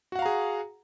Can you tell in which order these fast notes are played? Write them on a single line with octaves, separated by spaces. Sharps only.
F#4 F#5 F5 A#5 G#4